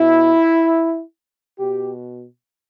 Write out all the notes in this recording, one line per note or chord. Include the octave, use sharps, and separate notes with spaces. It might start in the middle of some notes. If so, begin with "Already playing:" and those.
Already playing: B2 E4
B2 G4